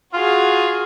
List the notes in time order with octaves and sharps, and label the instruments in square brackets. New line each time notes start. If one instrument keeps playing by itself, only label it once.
[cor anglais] F4 [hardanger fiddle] F#4 G#4